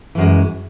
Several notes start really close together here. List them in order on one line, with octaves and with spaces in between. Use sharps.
E3 F#2 G#3